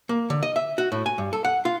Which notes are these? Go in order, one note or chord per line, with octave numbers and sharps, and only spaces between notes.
A#3
D3
D#5
E5
F#4
A2
G#5
G2
A4
F#5
F4